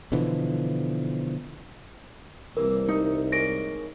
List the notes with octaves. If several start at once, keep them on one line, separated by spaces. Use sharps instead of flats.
B2 D3 E3 F3
C2 E3 A#3 A#4
D#4
G#3 A#3 C#4 A#6 D7